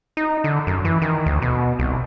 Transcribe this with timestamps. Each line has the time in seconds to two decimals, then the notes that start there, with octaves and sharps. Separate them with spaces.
0.17 D#4
0.44 D3
0.67 F#2
0.85 E3
1.02 D#3
1.26 D2
1.42 B2
1.79 C2